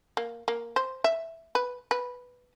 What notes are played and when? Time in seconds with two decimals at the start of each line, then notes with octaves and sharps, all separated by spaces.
0.17 A#3
0.48 A#3
0.76 C5
1.04 E5
1.55 B4
1.91 B4